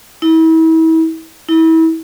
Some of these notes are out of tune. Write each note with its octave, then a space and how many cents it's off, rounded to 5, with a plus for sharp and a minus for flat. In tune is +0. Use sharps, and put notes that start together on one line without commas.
E4 -35
E4 -30